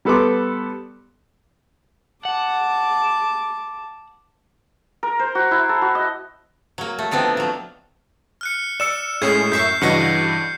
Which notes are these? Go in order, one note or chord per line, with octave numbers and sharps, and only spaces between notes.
G3 B3 A4 B4 C6 D6
F#5 A5 D6
A#4
C5
F#4
E4
A4
F#4
D#5
F#3 A#3
A3
F3 B3 C4 D4 D#4
F3 F#3
F6 F#6 C#7
D5 E6 C#7 E7
A2 G#3 C#4 G#4 G#6 C7
F#2 E5 C#6 G6 C7
G2 C#3 E3 F#4 D#5 A#6 C#7